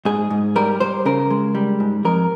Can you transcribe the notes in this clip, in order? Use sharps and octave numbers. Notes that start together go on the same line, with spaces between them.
G#2 G#4
G#2
G3 A#4
G3 C5
C#3 A#4
G#3
G3
G#2
F2 A#4